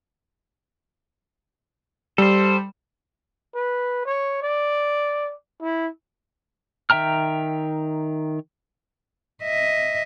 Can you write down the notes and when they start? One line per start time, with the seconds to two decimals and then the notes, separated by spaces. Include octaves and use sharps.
2.18 G3 A4 C5
3.55 B4
4.06 C#5
4.42 D5
5.62 E4
6.90 D#3 E5 G5 A#5 F6
9.44 D#5 E5